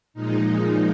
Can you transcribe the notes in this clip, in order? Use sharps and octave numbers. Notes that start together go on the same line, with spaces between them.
A#2 F3 G#3 D#4